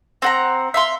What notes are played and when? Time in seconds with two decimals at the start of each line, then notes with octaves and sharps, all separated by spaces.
0.22 C4 F#5 A#5
0.74 E5 F5 C6